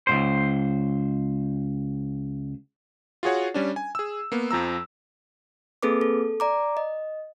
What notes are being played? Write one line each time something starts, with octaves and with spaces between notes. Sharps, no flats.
C#2 A#2 C5
F4 F#4 G#4 C#5 F#5
G3 C#4 D4
G#5
G#4 E6
A#3 B3
F2 F3 A#5 E6
A#3 C4 G#4 A4 B4 D6
A4
D5 A#5 D6
D#5